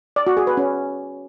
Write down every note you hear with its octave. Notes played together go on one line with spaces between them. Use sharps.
D5
F#4
G#4
B4
C#4